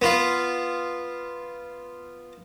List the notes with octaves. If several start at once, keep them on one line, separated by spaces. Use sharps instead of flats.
B3 F4